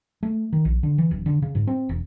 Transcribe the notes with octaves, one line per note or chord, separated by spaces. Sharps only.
A3
D#3
A#1
D3
E3
D1
D3
C#3
G#2
C4
E1